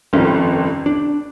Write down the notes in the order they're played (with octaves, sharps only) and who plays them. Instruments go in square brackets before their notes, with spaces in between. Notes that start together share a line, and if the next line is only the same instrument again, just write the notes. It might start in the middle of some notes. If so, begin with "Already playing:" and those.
[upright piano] G1 F2 C3 D#3 [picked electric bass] C#4
[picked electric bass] D4